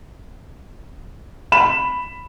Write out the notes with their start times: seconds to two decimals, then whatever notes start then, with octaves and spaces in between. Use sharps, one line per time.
1.52 B5 E7